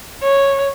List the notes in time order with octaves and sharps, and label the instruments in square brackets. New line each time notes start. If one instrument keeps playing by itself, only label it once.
[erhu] C#5